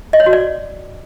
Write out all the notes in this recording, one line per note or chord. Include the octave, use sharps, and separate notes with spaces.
D#5
C#5
F#4
D5